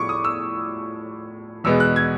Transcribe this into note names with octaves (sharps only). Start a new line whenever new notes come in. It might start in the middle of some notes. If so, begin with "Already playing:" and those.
Already playing: A2 F3 C#6 D6
D#6
E6
E2 B2 G#3 B3 E6
F#6
G#6